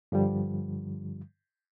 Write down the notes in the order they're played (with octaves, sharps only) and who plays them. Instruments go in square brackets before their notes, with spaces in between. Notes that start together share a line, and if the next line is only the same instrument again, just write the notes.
[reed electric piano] G2 D3 F3 G3